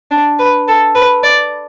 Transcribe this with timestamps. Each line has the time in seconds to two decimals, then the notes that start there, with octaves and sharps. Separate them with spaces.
0.11 D4
0.39 B4
0.68 A4
0.95 B4
1.24 D5